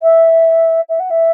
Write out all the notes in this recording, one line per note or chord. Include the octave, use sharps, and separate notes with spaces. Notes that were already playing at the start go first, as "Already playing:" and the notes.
E5
E5
F#5
E5